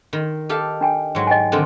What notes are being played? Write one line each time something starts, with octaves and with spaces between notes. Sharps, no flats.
D#3
G4 A4 F5
D4 G5 G#5
G#2 F#3
D#5 G5 G#5
D3 D#3 C4